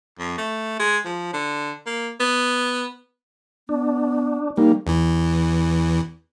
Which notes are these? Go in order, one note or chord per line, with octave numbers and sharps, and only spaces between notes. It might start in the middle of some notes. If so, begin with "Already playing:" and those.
F2
A3
G#3
F3
D3
A#3
B3
B3 D4
G3 A#3 D#4
E2 E3